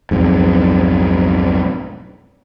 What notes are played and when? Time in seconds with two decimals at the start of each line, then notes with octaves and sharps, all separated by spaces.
0.11 B1 F2 G#2